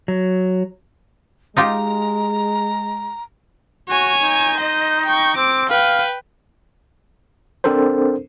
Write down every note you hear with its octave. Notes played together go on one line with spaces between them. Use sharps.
F#3
G#3 D#4 F4 G4 A#5
F#4 C#5 G#5
D#4
C5 D#5
G5 C#6
C4 D6 D7
B4 F5 G5
C4 D4 A4 A#4 C5